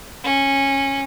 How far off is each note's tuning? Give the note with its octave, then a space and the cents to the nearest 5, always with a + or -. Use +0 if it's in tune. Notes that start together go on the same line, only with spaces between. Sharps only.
C#4 -15